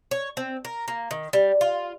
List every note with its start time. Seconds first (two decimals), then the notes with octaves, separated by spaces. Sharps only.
0.11 C#5
0.37 C4
0.65 A#4
0.88 A#3
1.11 D#3
1.33 G3
1.61 F4